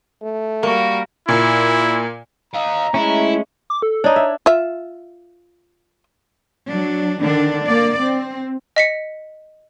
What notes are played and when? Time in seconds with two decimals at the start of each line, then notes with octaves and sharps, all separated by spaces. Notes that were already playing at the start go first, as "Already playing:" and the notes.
0.22 A3
0.63 G3 A#3 F#4 A#4
1.28 A#2 E4
2.54 D#5 F5 A#5
2.94 G#3 A3 C#4 E4
3.70 D6
3.82 A4
4.04 D4 D#4 C#5
4.16 E5
4.46 F4 E5
6.68 F#3 D4
7.21 D3 D#3 D4
7.66 A#3 D5
8.00 C4
8.76 D#5 B6 C#7